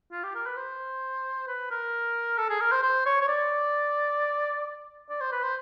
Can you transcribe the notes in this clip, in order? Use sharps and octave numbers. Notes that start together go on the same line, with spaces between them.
F4
G4
A#4
B4
C5
B4
A#4
A4
G#4
A#4
C5
C5
C#5
C#5
D5
D5
C5
B4
C5